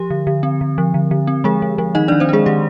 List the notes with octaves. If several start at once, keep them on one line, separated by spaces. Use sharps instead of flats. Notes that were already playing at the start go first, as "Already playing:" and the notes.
Already playing: F3 G4
D3
D3
C4
D3
F3
D3
D3
C4
F3 G#3 G#4
F3
F3
D#3 D#4 D#5
D#3 D4 D5
C4 C5
G#3 D4 G#4
D#3 G4